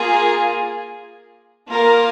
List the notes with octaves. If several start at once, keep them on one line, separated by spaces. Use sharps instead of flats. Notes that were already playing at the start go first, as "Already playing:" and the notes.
Already playing: A#3 F4 G#4
A#3 F4 A#4 F5